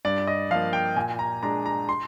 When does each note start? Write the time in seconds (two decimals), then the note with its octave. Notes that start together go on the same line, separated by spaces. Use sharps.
0.05 G2 D5
0.27 D#5
0.50 F3 A#3 F5
0.73 G5
0.96 A#2 G#5
1.19 A#5
1.43 G#3 D4 A#5
1.66 A#5
1.89 C6